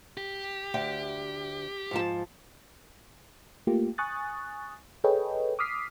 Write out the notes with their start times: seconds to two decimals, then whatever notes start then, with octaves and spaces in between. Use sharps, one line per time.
0.17 G4
0.74 D2 E5 G5
1.91 G#2 F3 A5
3.67 A3 A#3 F4 G4
3.98 G#5 C#6 D#6 F#6 A6
5.04 G#4 A4 B4 C#5 D#5 G5
5.59 D6 D#6 F6 B6 C7